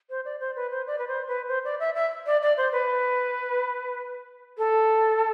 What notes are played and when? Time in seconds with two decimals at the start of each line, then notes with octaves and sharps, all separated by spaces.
0.10 C5
0.25 D5
0.40 C5
0.56 B4
0.71 C5
0.87 D5
0.99 B4
1.08 C5
1.27 B4
1.48 C5
1.64 D5
1.80 E5
1.95 E5
2.26 D5
2.42 D5
2.57 C5
2.72 B4
4.58 A4